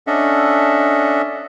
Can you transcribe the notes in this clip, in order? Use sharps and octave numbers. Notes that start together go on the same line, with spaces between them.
C#4 D4 A4 D#5 E5 F#5